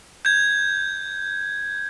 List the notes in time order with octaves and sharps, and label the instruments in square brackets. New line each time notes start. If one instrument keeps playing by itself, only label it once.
[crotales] G6 G#6